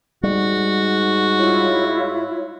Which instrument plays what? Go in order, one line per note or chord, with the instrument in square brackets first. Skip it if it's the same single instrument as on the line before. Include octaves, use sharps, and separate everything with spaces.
[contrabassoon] G#2 [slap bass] G3 [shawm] F#4
[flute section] E4 F4 C#5